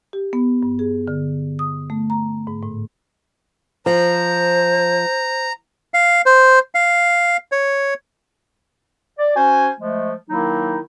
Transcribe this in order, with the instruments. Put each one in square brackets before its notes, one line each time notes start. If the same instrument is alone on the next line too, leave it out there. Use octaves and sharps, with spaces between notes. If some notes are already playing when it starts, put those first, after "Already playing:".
[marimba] G4
B3
G2
G#4
D3
D#6
A3
A#5
G#2
A2
[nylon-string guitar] F3 [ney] C5 [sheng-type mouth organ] A#5
[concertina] F5
C5
F5
C#5
[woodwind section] D5
C#4 F#4 C5 G#5
F3 G#3 A3
D#3 F#3 A#3 D#4 E4